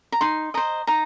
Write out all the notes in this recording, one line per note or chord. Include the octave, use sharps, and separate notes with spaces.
A#5
D#4 C6
C5 D#5 A#5
D#4 A#5